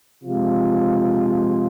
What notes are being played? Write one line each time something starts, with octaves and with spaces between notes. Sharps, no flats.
C3 F3 G#3 F4